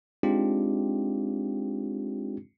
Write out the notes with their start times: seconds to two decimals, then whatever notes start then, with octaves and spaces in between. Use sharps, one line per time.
0.23 G#3 C4 D4 D#4 F4 G4